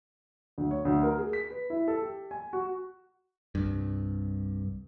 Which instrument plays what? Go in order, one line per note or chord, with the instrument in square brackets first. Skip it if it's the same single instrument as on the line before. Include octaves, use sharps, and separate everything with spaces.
[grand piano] D2
C#5
D2
A#4
G#4
B6
B4
E4
A4
G4
G#5
F#4
[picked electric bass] C2 G2